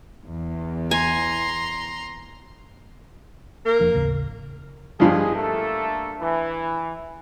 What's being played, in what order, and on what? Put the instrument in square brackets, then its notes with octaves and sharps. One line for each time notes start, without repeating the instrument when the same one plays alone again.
[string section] E2
[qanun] G#5 [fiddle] A#5 C6
[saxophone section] A#3 A#4
[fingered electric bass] F1 F3 D4
A1 D#2 C#3
[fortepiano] G2 F3 [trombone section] G#3 G#4
[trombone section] A3 A#3 A4
E3